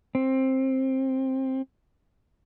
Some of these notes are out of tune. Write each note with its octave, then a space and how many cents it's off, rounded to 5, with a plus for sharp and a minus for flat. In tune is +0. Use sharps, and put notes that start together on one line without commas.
C4 +15